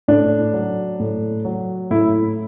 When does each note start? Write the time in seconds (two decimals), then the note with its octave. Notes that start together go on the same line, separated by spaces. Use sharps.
0.08 A2 D4
0.53 F#3
0.99 A2
1.45 F#3
1.90 A2 E4